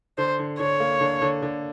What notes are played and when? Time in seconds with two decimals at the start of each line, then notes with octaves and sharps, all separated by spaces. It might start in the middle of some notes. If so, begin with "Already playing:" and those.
0.18 D3 C5
0.39 D3
0.60 D3 C#5
0.80 A#3
1.01 D3
1.22 D3
1.43 D3